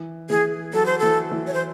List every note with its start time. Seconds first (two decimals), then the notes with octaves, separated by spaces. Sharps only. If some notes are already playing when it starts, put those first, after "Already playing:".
Already playing: E3
0.30 E3 G#4
0.73 F#3 A4
0.86 C5
0.99 E3 A4
1.31 E3
1.47 C#5
1.54 C5